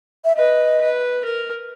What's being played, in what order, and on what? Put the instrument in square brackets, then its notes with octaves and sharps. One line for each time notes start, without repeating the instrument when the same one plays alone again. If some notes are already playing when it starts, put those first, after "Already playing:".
[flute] E5
[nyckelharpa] B4 [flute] D#5
[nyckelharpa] B4
A#4